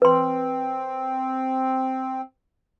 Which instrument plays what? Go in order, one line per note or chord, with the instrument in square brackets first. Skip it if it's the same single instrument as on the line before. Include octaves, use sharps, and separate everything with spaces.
[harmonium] C4 [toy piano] B4 C6